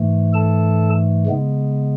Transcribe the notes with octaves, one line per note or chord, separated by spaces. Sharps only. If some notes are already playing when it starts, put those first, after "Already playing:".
Already playing: G#2 E3 A3
A4 A5
C#3 G#3 B3